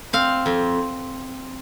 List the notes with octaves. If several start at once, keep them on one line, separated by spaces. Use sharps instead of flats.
C4 F5
F2